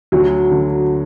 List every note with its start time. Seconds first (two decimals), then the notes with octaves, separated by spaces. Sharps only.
0.12 D2 F#3
0.51 D3